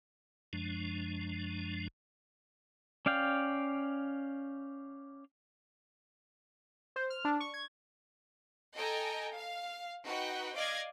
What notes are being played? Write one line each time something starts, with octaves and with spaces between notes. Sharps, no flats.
F#2 F3 G#3 D4
C#4 D5 F5 G5
C5
F6
D4
C#6
G#6
A4 D#5 G5 G#5 A#5
F5
D#4 F#4 B4 F#5 G5
D5 D#5 F5 D6 G#6 A#6